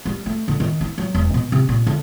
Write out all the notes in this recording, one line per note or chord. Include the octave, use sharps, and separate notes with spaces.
G3
A3
D3
D#3
E4
F#3
E1
B2
C3
A#2
D3